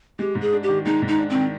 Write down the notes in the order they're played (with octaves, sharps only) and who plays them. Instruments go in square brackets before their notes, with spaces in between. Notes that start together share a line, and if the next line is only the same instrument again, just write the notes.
[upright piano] G#3 [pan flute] G4
[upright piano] G#2
[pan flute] G#4
[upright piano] D4
[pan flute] G4
[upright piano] D#3
[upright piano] G#3 [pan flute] D#4
[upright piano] G#2
[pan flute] D#4
[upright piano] D4
[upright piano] D#3 [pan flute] C4